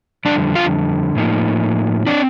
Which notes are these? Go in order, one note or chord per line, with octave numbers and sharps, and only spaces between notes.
F2 D3 G3 D4 D5
F4 F5
A2 F3 A#3 D#4
F3 C4 D4 D5